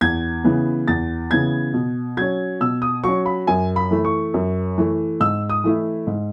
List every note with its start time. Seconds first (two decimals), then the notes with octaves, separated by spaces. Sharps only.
0.01 E2 G#6
0.44 C#3 E3 B3
0.88 E2 A6
1.31 C#3 E3 B3 G#6
1.74 B2
2.17 F#3 C#4 G#6
2.60 B2 E6
2.82 D#6
3.04 F#3 C#4 C#6
3.26 B5
3.47 F#2 G#5
3.76 B5
3.91 E3 A3
4.05 C#6
4.34 F#2
4.78 E3 A3
5.20 G#2 E6
5.49 D#6
5.64 E3 A3 E4
6.07 G#2